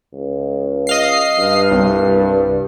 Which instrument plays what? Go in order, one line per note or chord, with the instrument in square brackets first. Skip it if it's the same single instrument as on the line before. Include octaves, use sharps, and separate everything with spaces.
[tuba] C#2
[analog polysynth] D#5 F5 C7
[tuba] G2
[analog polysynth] C2